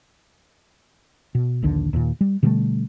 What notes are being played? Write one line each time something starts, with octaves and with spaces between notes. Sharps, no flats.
B2
A#1 D#2 D3
D#2 A#2
G3
B2 D3 G3 A3